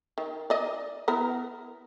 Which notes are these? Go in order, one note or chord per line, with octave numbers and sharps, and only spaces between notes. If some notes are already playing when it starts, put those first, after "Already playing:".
D#3
D5 D#5
B3 E4 A#4